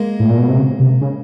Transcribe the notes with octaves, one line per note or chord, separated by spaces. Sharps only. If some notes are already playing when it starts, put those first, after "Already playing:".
Already playing: G#3 A#3
A2
A#2
B2
C3
C#3
C3
C#3